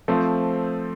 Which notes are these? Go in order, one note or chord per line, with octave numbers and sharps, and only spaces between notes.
F3 A3 C4